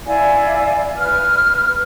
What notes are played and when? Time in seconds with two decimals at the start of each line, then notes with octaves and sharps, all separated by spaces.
0.06 E4 D5 F5 G#5
0.98 B4 F6